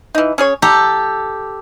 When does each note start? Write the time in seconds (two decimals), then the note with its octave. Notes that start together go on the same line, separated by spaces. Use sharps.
0.15 E3 D#4
0.38 C#4 G#4 C#5
0.62 G4 A4 A#5